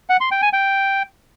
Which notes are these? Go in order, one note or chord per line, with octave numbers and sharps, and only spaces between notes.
F#5
C6
G5
G#5
G5